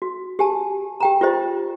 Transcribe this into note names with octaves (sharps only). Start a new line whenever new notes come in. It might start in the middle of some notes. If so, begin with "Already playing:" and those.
F#4
G4 G#5 A5
G4 G5 A#5
F4 G4 C5 D#5